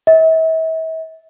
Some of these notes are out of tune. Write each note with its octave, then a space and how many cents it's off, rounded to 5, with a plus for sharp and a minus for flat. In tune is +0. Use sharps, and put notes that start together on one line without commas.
E5 -40